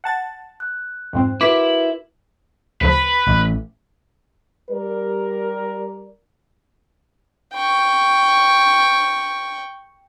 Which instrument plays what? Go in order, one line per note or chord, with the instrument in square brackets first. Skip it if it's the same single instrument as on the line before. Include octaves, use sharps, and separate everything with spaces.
[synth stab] F#5 A5 A6
[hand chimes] F#6
[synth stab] F2 G#2 C4
[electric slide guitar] E4 [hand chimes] F#4 A#4 B4 [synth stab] D6 B6
[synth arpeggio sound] D2 C#3 F3 [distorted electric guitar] B4 [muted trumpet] B5
[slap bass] A1
[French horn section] G3 A#4 D5
[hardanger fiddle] G5 C#6